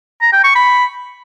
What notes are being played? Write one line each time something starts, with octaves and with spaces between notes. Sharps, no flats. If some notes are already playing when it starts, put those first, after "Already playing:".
A#5
G5
C#6
B5